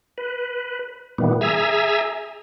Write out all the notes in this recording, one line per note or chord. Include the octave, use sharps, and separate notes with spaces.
B4
A#2 D#3 E3 G3 B3
G#4 E5 G#5 A#5 E6